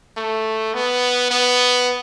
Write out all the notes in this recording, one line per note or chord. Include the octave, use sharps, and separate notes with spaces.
A3
B3
B3